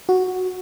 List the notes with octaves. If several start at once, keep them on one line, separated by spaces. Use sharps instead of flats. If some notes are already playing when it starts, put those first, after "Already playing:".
F#4